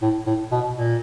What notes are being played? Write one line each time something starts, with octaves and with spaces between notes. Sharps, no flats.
A2
A2
B2
A#2